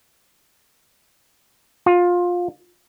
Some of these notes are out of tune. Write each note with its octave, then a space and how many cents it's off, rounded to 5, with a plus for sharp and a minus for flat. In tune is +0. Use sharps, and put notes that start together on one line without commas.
F4 +20